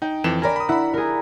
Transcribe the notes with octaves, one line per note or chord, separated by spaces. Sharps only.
D#4 G5
F2 E3 E7
A#4 D5 G#5 A#5 B5
B5 D#6
E4 F#5 B5
G#4 A#4